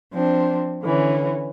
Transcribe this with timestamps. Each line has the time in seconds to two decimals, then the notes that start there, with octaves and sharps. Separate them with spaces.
0.12 F3 C4 D4
0.82 D3 E3 C#4